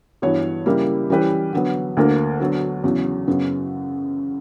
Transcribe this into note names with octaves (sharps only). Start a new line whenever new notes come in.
G2 E3 B3 F#4 C#5
C#3 G3 A#3 E4
E3 G3 C#4 G4 B4
D3 F#3 B3
D2 D3 A#3
D3 F#3 B3
E2 C#3 F#3
F#2 C#3 F#3 B3